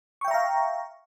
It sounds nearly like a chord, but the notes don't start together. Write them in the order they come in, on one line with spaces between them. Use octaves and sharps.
C#6 G5 E5 A#5 F5